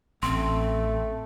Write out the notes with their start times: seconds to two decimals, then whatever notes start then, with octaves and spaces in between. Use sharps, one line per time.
0.23 A1 A3 C4 C6